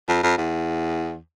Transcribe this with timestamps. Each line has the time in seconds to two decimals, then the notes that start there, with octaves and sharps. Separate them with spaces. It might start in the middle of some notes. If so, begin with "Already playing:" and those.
0.08 F2
0.23 F2
0.38 E2